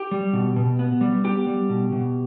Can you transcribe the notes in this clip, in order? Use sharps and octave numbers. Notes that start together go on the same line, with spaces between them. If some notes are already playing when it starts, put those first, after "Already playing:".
Already playing: G4
G3
B2
B2
B3
G3
B3 G4
G3
B2
B2